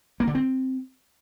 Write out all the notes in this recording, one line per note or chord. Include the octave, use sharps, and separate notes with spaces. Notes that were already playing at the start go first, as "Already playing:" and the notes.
A#3
D3
C4